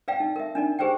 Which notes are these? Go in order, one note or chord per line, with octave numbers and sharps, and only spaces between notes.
B4 D5 F5 G5
D#4
A#4 E5
D4 D#4 D5
G4 G#4 B4 C5 D5 G5